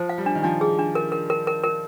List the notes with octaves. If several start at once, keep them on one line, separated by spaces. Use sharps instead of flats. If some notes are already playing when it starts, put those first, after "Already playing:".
Already playing: F3 C5
F5
G3
D4
D#3
F3 D4
G#4
D4
A#4
A#4
A#4
A#4
A#4